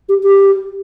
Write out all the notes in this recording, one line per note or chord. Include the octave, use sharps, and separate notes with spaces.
G4
G4